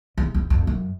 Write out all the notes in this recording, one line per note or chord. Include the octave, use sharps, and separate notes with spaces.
E2
E2
F2
F#2